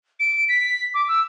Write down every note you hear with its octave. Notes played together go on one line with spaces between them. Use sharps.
D7
B6
D6
E6